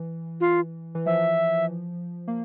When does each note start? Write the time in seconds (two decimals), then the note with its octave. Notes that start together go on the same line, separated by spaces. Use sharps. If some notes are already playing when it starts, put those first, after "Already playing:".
Already playing: E3
0.41 F4
0.95 E3
1.06 F3 E5
2.28 A#3